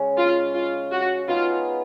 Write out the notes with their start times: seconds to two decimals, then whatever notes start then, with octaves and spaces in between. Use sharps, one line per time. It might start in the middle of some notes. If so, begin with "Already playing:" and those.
Already playing: C#3 G#3 C#4
0.17 F4
0.54 F4
0.92 F#4
1.28 B3 D#4 F4 G#4 B4